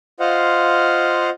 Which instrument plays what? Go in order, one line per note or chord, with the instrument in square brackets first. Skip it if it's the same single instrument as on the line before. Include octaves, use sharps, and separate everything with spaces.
[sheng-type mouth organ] F4 C5 D#5 F5 F#5